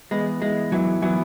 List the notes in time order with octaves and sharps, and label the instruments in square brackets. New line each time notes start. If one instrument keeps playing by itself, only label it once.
[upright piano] E3 B3 E4 [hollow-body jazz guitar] G#3
[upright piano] E3 B3 E4 [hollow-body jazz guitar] G#3
[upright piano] E3 B3 E4 [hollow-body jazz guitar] F#3
[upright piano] E3 B3 E4 [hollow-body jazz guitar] F#3